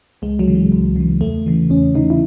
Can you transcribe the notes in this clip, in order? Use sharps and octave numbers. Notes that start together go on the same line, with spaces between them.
C#2 G#3
F#3
C#3 E3
G#3
C#2
C#3 E3
E2 A3
C#3 E3
E2 C#4
C#3 E3 D#4
E4